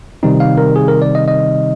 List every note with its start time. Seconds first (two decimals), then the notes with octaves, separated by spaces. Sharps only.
0.23 C3 D#3 G3 C4 D#4
0.40 F5
0.58 A#4
0.76 G#4
0.88 A#4
1.02 D5
1.15 D#5
1.28 D#5